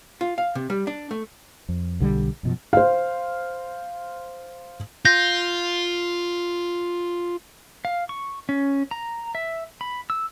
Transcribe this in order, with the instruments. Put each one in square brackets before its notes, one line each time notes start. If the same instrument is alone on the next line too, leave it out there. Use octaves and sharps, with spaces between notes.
[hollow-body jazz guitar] F4
F5
C3
G3
D4
A3
[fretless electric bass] F2
B1 D3 E3 G3
F#2 B2 F3
[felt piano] C5 F5
[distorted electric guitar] F4 [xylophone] G6 A#6
[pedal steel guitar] F5
C#6
C#4
A#5
E5
B5
E6